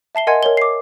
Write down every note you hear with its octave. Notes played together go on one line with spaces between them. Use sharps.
E5 A5 C7 G7
A#4 D#5 F#5 G#5 C6 G#6
A#4 C#5 G7
D6 C7